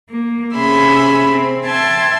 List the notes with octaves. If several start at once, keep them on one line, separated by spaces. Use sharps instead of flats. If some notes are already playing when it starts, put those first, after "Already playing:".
A#3
C3 C#4 G#4 E5 B5 C6
C4
E5 G5 A5 C6 G#6